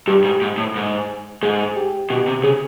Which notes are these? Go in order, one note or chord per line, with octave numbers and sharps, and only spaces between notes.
G2 G4
G#2
G4
G#2
A2
G#2
G#2 G#4
G4
B2 G4
C3
C#3 G#4